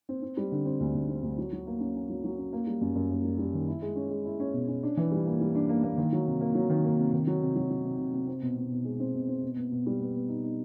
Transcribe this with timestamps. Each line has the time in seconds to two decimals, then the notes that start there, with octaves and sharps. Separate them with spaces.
0.09 C4
0.22 C4
0.37 G3
0.52 D3
0.65 C4
0.80 D2
0.95 D2
1.09 C4
1.23 D2
1.38 F#3
1.52 F#3
1.67 A#3
1.80 C#4
1.96 C#4
2.09 F#3
2.24 F#3
2.38 C#4
2.53 A#3
2.67 G3
2.81 F#2
2.95 F#2
3.11 A#3
3.24 G3
3.38 G3
3.54 D#3
3.68 E4
3.82 G#3
3.96 C#4
4.10 G#3
4.25 E4
4.40 C#4
4.53 B2
4.68 C#4
4.83 D4
4.97 E3
5.11 G3
5.26 A#3
5.41 G3
5.55 D4
5.69 A#3
5.83 A#3
5.98 D#3
6.12 F#3
6.27 C3
6.41 A#3
6.55 F#3
6.70 D#3
6.84 A#3
6.99 C3
7.13 D#3
7.27 F#3
7.42 C3
7.56 F#3
7.70 F#3
7.84 C3
7.99 C3
8.13 C3
8.27 C4
8.42 B2
8.57 B2
8.71 B2
8.85 G#3
9.00 C4
9.14 B2
9.28 C4
9.43 B2
9.57 B3
9.72 B2
9.86 G3
10.00 B3
10.15 B3
10.28 D#4
10.43 D#4